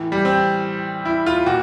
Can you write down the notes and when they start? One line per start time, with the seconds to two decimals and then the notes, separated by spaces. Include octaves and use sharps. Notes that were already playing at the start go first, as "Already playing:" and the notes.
Already playing: A2 E3
0.12 G3
0.25 C4
1.05 E4
1.26 F4
1.46 A#2 F#4